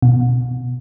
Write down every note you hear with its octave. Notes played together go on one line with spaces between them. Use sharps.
B2